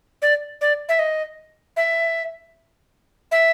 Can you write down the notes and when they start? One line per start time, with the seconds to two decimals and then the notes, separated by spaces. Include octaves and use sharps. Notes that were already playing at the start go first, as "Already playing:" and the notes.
0.22 D5
0.61 D5
0.89 E5
0.99 D#5
1.77 E5
3.32 E5